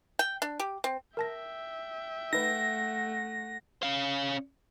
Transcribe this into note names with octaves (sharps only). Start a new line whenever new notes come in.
G5
D4
G4
C4
A#4 E5 G5 A5 A#6
A3 D#4 B4 F#5 A#6
C#4 F5